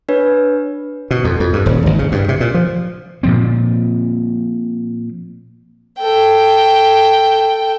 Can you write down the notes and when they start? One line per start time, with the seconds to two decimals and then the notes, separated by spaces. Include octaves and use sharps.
0.09 D4 B4 C#5
1.11 B2
1.25 F2
1.40 F2
1.53 G2
1.66 D#1
1.86 G#1
1.99 C#3
2.12 G2
2.29 C3
2.40 A#2
2.54 F3
3.23 A#2 F3 C4
5.99 A4 G5